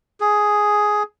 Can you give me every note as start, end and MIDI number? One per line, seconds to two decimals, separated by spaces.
0.20 1.03 68